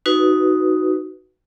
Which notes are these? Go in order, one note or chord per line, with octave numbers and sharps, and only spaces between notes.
D#4 F#4 B4